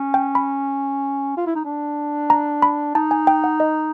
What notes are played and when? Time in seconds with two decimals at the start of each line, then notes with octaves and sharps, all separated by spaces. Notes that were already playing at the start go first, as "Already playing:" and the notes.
Already playing: C#4
0.14 G5
0.35 B5
1.37 F4
1.46 E4
1.56 D#4
1.65 D4
2.30 A#5
2.62 B5
2.95 D#4 A5
3.11 G#5
3.27 G5
3.44 F#5
3.60 D#5